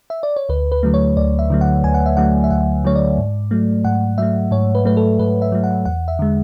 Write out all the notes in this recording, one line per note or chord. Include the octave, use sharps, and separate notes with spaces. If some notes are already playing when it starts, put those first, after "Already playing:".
E5
D5
C#5
D2 B4
B4
D3 F#3 A3
C#5
D2 D5
E5
D3 F#3 A3
F#5
D2 G#5
F#5
E5
D3 F#3 A3 F#5
E5
D2 F#5
D3 F#3 A3 C#5
D5
G#2
F#3 A3
G#2 F#5
F#3 A3 E5
G#2 C#5
B4
F#3 A3 B4
A4
G#2 B4
E5
F#3 A3
F#5
E2 F#5
E5
D3 G#3